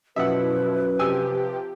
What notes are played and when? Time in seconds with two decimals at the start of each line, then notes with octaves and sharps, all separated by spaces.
0.16 F#2 B2 F3 E4 B4 E5 F#5
0.99 C3 F3 G4 G#5 E6